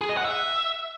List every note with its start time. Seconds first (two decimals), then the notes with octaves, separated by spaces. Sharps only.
0.01 G#4
0.09 D#5
0.17 F#5
0.25 E5